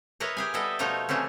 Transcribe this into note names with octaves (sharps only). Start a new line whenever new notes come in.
E4 A#4 B4 C#5 D#5
G4 G#4 G#5
G3 B3 E4 A4 D#5 E5
B2 F3 A3 D#4 C#5 D#5
C#3 E3 A3 C4 C#4